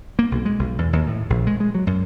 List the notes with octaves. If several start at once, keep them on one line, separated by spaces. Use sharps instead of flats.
A#3
B1
G#3
B1
E2
D#2
A2
A#1
G#3
G#3
F#3
F#2